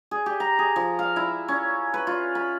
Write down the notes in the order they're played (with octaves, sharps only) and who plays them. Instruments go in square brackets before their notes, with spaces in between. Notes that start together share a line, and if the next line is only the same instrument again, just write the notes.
[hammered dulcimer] G#4
G4
A#5
G#4
F3
F5
E4
C#4
B4
F4
B5